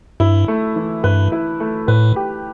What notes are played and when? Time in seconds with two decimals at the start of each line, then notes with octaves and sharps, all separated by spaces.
0.20 G2 E4
0.48 A3
0.76 E3
1.03 G2 B4
1.32 E4
1.60 A3
1.88 A2 B4
2.16 G4